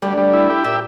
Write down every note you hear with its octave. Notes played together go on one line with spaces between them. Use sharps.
D2 D3 G3
G3
E4
G4
A#2 E5